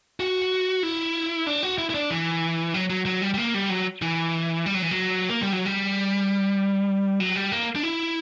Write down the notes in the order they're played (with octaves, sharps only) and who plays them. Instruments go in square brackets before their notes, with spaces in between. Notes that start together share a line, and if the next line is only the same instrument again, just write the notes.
[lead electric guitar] F#4
E4
D4
F#4
E4
E4
D4
E3
F#3
F#3
F#3
G3
G3
A#3
G3
F#3
E3
G3
F#3
E3
F#3
A#3
G3
F#3
G3
F#3
G3
A#3
D4
E4